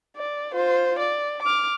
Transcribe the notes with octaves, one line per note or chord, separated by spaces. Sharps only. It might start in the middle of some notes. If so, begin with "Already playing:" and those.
D5
F4 C5
D5
D6 F6